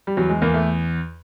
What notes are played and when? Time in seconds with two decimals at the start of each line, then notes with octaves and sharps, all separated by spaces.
0.07 G3
0.17 E2 F#3
0.29 G#3
0.42 E2 A#3
0.54 A3